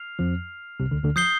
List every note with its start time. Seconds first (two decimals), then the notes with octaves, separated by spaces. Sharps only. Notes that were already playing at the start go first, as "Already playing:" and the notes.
Already playing: F6 C7 F7
0.19 F2 F3
0.80 C2 C3
0.91 D2 D3
1.03 D2 D3
1.16 F3 D#6 G6 C7 G7